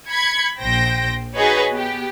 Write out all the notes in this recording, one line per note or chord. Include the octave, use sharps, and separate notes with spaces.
B5 G#6 C#7
A#1 C5 G5 G6 A#6
D#4 F#4 G#4 B4 C#5 D#5
B3 G4